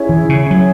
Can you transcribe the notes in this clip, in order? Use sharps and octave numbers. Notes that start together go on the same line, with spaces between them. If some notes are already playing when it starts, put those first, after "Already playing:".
Already playing: C#4 E4 G#4 C#5
E3
C#3
F#3